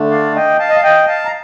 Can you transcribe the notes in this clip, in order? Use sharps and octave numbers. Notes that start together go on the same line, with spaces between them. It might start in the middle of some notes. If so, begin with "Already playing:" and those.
Already playing: D3 A3 D4
D5 F5
D#5 G5
F5 A5
D#5
F5
D#5 G5
F5 A5
A#5